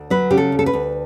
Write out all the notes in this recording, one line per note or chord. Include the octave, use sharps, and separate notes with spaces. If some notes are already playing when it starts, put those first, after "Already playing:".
Already playing: D2
F#3 B4
C#3 G4
A4
D2
A4
B4
D2